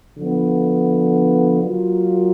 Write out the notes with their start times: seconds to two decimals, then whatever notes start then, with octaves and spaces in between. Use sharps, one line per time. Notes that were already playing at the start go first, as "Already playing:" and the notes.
0.18 D3 F3 B3
1.62 F#3 A#3 F4